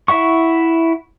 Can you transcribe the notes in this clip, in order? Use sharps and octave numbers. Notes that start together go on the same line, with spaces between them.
E4 E5 F#5 C#6